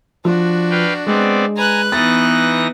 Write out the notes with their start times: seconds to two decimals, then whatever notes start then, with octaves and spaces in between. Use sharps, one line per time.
0.25 F3 D4 F#4
0.71 B4 F5 G5
1.07 G#3 B3 C4 D5
1.57 B4 G#5 A#5 F#6
1.92 E3 B3 D#4 A6 A#6